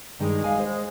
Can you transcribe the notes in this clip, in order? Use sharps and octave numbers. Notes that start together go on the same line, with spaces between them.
G2 D#3 G#3 D#4
F5 G#5
C5